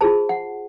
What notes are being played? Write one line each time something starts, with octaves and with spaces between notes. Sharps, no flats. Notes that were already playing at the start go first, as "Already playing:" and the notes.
F4 G#4 C5 A5
F#5